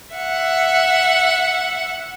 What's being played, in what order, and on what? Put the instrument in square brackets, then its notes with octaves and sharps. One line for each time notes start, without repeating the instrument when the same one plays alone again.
[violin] E5 F#5